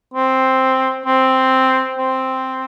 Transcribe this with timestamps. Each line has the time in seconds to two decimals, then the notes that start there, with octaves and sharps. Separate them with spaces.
0.14 C4
1.06 C4
1.98 C4